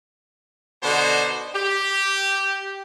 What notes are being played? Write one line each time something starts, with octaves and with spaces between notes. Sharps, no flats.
B2 D3 D#4 F#4 C5
G4